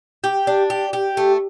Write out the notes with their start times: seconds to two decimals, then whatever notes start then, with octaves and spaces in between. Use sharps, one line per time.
0.24 G4
0.47 D4
0.70 G4
0.93 G4
1.17 A3